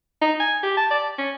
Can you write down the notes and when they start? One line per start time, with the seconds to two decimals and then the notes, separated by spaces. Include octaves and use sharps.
0.22 D#4
0.40 G#5
0.63 G4
0.77 A5
0.90 D5
1.18 C#4